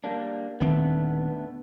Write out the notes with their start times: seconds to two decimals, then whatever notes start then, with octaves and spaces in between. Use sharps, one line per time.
0.04 G3 A#3 D4
0.60 D#1 D3 D#3 A3 B3 C4